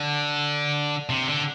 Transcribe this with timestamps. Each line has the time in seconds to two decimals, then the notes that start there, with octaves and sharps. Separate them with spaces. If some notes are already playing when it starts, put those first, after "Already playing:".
Already playing: D3
1.09 C3
1.28 D3